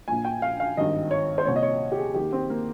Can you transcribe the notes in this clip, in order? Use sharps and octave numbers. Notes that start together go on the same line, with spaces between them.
A#1 A#2 G#5
G5
F5
F5
G#1 G2 D#3 D#5
C#5
C5
C2 A#2 C#5
D#5
C#5
G4
G#4
D#2 D#3 G4
C4
A#3